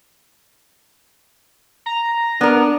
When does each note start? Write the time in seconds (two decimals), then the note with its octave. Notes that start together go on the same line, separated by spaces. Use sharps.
1.86 A#5
2.41 B3 D4 A#4